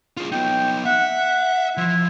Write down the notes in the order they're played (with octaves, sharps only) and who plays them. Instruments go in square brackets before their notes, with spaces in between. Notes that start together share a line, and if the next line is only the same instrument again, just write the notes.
[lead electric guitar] F4 G#4
[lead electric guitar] B3 D#4 [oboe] G5
[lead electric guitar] E5 [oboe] F#5
[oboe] F#5
[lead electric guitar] F3 F4 [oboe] E4